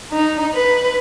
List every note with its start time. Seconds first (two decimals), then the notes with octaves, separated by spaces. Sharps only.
0.12 D#4
0.54 B4